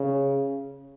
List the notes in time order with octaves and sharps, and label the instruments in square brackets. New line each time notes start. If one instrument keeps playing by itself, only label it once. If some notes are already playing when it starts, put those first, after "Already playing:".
Already playing: [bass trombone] C#3